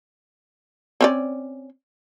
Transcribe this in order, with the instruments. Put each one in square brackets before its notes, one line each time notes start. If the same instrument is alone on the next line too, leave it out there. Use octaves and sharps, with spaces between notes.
[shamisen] C4 C#4 D5